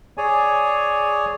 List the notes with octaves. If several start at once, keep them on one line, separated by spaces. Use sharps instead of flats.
G#4 C#5 D5 G#5